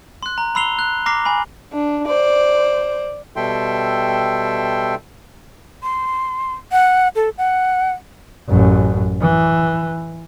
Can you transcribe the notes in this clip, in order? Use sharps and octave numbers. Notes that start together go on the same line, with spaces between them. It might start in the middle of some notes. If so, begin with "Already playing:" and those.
C6 F#6
A#5
B5 C6 E6 C7 F7 G7
F#6
A#5 D6 F6 A#6 C7
G#5 B5
D4
C5 D5
B2 G3 A4 E5 G5 C6
C6
F#5
A4
F#5
A1 F#2
E3